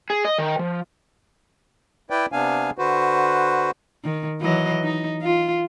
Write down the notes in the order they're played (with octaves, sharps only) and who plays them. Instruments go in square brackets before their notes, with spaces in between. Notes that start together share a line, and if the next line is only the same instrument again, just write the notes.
[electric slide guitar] G#4
D#5
D#3
F3
[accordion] E4 B4 D5 G5
C3 B3 D4 F5 G#5
D3 F#4 B4 C5
[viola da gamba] D#3
E3 F#3 D#5
D#4
F4